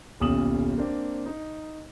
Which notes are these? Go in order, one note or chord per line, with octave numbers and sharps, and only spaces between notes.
D#1 B1 C#4 D#6 E7 F#7
A#3 C4 D4
D#4